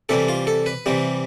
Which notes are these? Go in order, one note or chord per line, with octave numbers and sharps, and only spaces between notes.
C3 E3 G3 A4
F4
A4
B4
C3 E3 G3